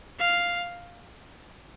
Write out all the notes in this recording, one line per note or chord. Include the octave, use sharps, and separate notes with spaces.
F5